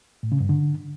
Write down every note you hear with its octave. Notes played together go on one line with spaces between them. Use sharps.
A2
C#3
G2
D3